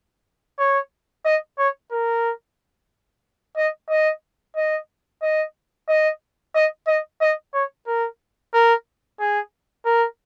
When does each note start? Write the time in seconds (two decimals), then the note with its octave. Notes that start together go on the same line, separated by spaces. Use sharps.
0.59 C#5
1.25 D#5
1.58 C#5
1.92 A#4
3.57 D#5
3.90 D#5
4.56 D#5
5.22 D#5
5.89 D#5
6.55 D#5
6.87 D#5
7.21 D#5
7.54 C#5
7.87 A#4
8.54 A#4
9.20 G#4
9.85 A#4